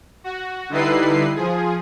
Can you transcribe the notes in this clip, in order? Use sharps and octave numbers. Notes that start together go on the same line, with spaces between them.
F#4
D3 G3 D#4 E4 B4 C7
F3 G#4